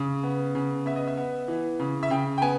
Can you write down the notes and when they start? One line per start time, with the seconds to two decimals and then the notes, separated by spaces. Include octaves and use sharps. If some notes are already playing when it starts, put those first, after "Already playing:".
Already playing: C#3
0.23 B3
0.55 C#3
0.86 B3 E5
0.96 D#5
1.07 E5
1.17 B3
1.48 E3
1.80 C#3
2.03 E5
2.10 C#3 G5
2.38 G5
2.42 B3 G#5